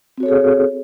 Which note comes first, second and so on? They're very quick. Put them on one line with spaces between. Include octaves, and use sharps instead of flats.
C4 F#4 C#5 A4 G#4